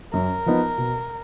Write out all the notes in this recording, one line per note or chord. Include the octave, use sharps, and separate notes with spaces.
F#2 A#4
F3 B3 D#4
B2